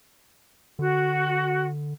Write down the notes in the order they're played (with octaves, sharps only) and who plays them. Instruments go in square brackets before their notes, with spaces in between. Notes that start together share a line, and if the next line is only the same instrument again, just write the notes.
[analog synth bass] D3 [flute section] F#4